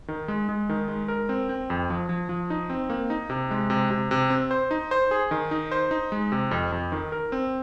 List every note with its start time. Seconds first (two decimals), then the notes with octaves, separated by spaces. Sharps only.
0.08 D#3
0.28 G#3
0.49 G#3
0.69 D#3
0.88 G#3
1.08 A#4
1.29 C4
1.49 C4
1.70 F2
1.90 F3
2.09 F3
2.29 F3
2.50 D#4
2.70 C4
2.90 A#3
3.10 D#4
3.30 C3
3.51 G#3
3.70 C3
3.91 C3
4.11 C3
4.30 C4
4.51 C5
4.71 D#4
4.91 C5
5.11 G#4
5.31 D#3
5.51 D#4
5.72 C5
5.91 D#4
6.12 G#3
6.32 C3
6.51 F2
6.72 F2
6.92 D#3
7.12 A#4
7.32 C4